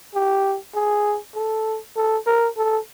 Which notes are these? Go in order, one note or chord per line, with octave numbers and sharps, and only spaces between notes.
G4
G#4
A4
A4
A#4
A4